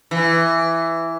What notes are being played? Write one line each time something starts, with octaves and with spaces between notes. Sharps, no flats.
E3